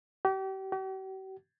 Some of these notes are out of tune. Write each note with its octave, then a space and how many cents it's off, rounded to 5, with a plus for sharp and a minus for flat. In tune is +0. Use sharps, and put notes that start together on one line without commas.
G4 -35
G4 -45